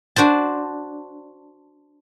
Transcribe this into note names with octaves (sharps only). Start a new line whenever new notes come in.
D4 F#4 C5 A5